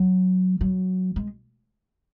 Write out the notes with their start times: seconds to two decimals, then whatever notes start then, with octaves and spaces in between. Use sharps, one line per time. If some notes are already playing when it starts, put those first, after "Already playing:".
Already playing: F#3
0.61 F#3
1.16 G#3